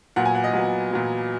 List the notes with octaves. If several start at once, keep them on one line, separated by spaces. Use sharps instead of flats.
A#2 F#3 B3 F#5
G#5
F#5
D#5
A#2 F#3 B3
A#2 F#3 B3